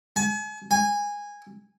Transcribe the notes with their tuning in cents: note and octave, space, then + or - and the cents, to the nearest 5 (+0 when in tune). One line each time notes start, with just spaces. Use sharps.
G#5 +40
G#5 -15